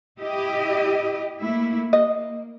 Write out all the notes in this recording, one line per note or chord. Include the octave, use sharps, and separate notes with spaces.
E4 G4 D#5
A3 A#3 E4
A#3 D#5